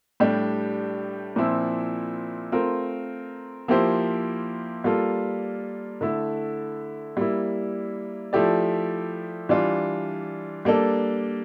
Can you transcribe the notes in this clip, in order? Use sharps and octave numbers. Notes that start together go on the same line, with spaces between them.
A2 G3 D4 G4
A#2 F3 C4 E4
A3 C4 F4 A#4
F3 A#3 E4 G4 C5
G3 A#3 F4 A4
D3 A3 E4
G3 A#3 E4
F3 A3 E4 G4 D5
E3 G3 D4 F4
G3 A#3 D4 A4